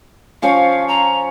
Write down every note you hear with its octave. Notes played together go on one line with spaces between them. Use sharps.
F3 C#4 C#5 F5
A#5